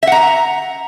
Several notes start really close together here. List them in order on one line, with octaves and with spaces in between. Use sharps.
E5 F#5 A#5